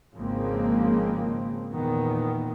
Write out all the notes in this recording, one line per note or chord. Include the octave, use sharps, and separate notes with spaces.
G#1 C#3 F3 G#3 A#3 C4
E2 A#2 D#3 B3